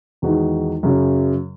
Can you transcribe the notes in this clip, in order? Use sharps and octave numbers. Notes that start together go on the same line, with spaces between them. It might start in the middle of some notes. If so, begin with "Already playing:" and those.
E2 D#3 G#3 D#4 F#4
F#2 C#3 F#3